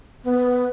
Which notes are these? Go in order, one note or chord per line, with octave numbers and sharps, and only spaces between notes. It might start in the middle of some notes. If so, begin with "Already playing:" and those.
B3